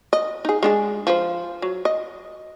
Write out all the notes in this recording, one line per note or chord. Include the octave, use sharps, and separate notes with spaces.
D#5
D#4 G#4
G#3 D4 G#4
F3 C5
F#3
D#5